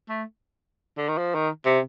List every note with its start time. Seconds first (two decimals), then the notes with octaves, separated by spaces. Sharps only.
0.09 A3
0.97 D3
1.09 D#3
1.18 F3
1.34 D#3
1.65 C3